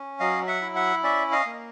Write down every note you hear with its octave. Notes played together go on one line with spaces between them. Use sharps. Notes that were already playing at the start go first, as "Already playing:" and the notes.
Already playing: C#4
F#3 D#5 F5
E5 F#5
E4
E5 F#5
C#4 D5 E5
D#5 F5
A#3